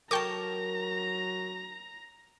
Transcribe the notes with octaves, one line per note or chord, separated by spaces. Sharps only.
F#3 A#4 G5 A5 A#5 C#6 D6